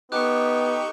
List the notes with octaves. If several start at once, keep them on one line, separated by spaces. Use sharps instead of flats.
B3 D#4 G4 A4 C#6 D6 F#6